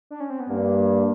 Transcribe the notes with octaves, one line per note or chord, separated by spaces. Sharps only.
D4
C#4
C4
B3
G2 A#3